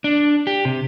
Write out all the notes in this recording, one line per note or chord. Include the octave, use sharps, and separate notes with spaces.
D4
G4
C3